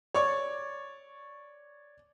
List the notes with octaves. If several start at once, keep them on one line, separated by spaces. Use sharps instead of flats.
C#5 D5 C#6